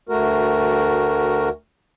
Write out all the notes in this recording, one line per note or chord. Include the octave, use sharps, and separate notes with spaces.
D2 A3 F#4 A#4